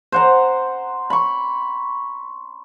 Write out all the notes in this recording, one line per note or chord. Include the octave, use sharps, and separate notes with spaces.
C5 F#5 A#5
B5 C#6